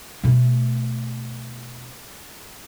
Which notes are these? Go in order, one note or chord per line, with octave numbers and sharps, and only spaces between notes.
B2 A3